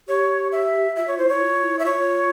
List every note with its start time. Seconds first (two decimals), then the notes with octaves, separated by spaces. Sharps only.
0.08 G4 C#5
0.52 E5
0.96 F4 E5
1.08 C#5
1.18 E4 C5
1.29 E4 C#5
1.41 F4
1.63 E4
1.79 E5
1.85 F4 C#5